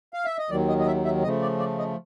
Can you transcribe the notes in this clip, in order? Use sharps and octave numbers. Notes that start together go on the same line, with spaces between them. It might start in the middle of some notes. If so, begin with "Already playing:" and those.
F5
E5
D#5
D#2 D#3 F#3 D5
D#5
D#5
E5
E5
C#3 F3 A3 D#5
D5
D5
D#5